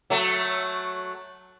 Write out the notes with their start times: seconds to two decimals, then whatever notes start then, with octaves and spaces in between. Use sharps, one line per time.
0.10 F#3 A3